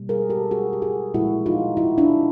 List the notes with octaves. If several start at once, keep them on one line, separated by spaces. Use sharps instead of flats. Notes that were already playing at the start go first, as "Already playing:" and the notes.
Already playing: B2 G3 A#3
G#4 A#4
G4 A4
F#4 G#4
G4
F#4 G#4
A#2 F3 G#3 E4 F#4
D#4 F4
E4 F#4
D4 E4